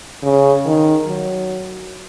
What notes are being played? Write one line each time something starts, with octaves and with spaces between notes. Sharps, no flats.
C#3
D#3
F#3